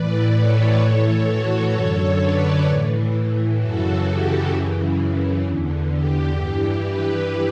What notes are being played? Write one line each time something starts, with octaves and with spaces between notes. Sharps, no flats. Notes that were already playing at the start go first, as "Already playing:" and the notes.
Already playing: A2 E3 B4 D5
A4 C#5
A2 E3
F#4 A4
F#2 D3 A4 C#5
B4 D5
A2 E3
F#2 C#3 E3 F#4 A4
G4
F#2 C#3 E3
E2 D3
G4
G2 E3
G4 B4